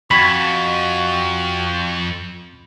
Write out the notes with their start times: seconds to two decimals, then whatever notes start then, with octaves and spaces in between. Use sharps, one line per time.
0.11 F2 F#4 B5 G#6